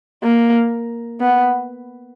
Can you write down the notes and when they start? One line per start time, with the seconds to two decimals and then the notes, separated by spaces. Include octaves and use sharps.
0.23 A#3
1.21 B3